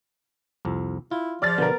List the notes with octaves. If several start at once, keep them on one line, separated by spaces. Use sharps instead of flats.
C2 F2
E4 F4
F3 D5 F6 A6
B2 D3 B3 A#4